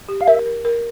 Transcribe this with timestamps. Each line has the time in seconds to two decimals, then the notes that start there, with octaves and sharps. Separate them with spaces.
0.09 G4
0.21 F5
0.27 A#4 E5
0.46 A#4
0.65 A#4